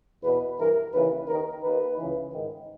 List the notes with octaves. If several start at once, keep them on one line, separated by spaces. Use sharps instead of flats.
E2 B2 B4
G2 E3 A#4
D#2 C#3 E3 B4
D#2 D#3 A#4
D#2 D#3 B4
C#2 C#3 E3
G#2 D#3